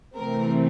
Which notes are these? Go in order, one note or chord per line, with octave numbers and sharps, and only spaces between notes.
C3 E3 A3 C4 A#4